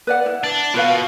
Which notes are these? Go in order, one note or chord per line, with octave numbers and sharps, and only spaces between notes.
B4 D5 F#5
E4
D4
B2 F4 B4 F5